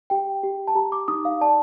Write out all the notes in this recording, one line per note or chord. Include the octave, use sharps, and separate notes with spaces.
G4 G5
G4
A5
G4 A#5
D6
D#4 D#6
F5
D5 A5